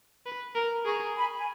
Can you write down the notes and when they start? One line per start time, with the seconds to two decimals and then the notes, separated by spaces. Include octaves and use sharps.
0.26 B4
0.56 A#4
0.85 G#4 A#5 C#6
1.15 G#5 B5
1.37 G#5